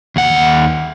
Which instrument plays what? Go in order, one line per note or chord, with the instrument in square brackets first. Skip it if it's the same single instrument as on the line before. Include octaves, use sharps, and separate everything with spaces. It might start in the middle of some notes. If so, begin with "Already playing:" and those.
[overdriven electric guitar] D#2 F#5